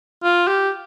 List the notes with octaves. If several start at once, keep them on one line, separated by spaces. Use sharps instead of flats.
F4
G4